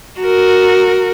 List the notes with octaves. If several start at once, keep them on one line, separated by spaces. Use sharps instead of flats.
F#4 A#4